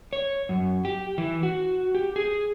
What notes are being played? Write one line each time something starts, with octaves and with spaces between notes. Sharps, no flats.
C#5
F#2
G4
E3
F#4
G4
G#4